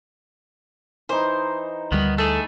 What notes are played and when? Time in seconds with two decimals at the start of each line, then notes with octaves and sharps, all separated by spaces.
1.09 E3 D#4 C5
1.92 D2 D#3 G3 B3
2.18 A3 G#4 A4